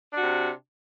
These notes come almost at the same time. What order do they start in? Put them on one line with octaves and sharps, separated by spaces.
D4 F#4 C3